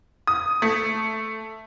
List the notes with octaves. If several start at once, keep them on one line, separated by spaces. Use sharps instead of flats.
D#6
A3